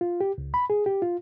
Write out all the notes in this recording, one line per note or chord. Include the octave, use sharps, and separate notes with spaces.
F4
G4
C#2
B5
G#4
G4
F4